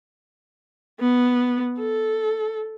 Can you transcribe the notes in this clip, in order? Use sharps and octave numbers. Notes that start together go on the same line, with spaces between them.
B3
A4